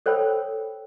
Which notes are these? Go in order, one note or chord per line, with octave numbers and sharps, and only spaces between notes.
A4 C5 C#5 G5 B5 E6